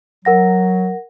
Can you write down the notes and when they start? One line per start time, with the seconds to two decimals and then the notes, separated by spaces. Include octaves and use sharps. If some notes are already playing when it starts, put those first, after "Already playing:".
0.25 F#3 A#4 F#5 A#6